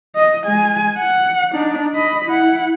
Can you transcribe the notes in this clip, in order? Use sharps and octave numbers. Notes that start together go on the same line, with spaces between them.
D#5
G#3 G#5
F#5
D4 D#4
D#5 B5
E4 F#5